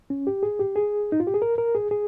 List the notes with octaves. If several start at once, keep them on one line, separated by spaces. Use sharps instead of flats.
C#4
G4
G#4
G4
G#4
D#4
F4
G4
G#4
A#4
A#4
G#4
G#4